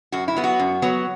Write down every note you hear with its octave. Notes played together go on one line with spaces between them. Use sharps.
F#2 F#4
E4
F#3 B3
F#4
F#2
F#3 B3